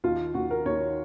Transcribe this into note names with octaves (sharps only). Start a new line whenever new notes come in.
D#2 F4
D#2 F#4
A#4
D#2 C#5